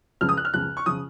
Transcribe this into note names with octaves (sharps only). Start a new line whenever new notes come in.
C#2 C#3 F3 F6
D#6
F#6
F6
C#2 C#3 F3 F#6
C#6
C#3 F3 D#6